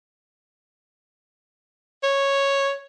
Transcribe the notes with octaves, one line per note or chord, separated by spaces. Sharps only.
C#5